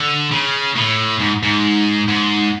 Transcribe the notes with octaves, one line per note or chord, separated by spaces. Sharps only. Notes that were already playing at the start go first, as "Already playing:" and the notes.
Already playing: D3
C#3
A2
G#2
G#2
G#2